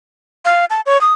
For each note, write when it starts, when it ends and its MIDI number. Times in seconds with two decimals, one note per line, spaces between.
0.45 0.65 77
0.70 0.81 81
0.86 1.00 73
1.01 1.13 87